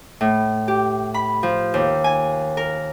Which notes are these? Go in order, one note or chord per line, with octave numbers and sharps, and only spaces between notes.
A2
G4
B5
F3
D#2
G#5
A#4